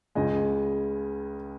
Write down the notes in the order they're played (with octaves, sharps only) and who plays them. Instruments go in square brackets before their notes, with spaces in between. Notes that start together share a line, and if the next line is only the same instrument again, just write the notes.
[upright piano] C#2 C#3 G#3 D#5